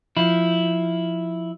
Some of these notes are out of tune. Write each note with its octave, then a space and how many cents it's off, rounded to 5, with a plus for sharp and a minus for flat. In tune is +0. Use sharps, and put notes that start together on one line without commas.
F3 +0 E4 -5